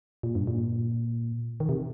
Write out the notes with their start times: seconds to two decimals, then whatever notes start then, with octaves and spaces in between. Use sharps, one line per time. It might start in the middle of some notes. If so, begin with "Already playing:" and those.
0.23 A#2
0.35 G2
0.47 A#2
1.60 D#3
1.69 C3